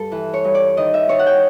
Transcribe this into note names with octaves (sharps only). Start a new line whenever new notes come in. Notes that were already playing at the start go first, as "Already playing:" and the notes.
Already playing: G2 A4
E3
C#5
G2
D5
D#3 D#5
E5
D#3 C#5
F#5
G5